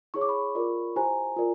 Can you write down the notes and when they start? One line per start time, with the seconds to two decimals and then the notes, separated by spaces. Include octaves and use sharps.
0.14 E4 G#4 C#5 C#6
0.21 D6
0.29 B5 C#6
0.55 F4 A#4 D5
0.96 E4 G4 C5 G#5 A#5
1.37 F4 A#4 D5